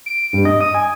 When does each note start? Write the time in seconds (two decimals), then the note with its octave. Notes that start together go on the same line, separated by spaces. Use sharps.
0.06 D7
0.33 G2
0.45 D#5
0.61 D#6
0.75 G#5